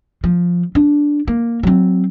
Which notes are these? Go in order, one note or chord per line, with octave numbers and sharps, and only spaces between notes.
F3
D4
A#3
F#3 C4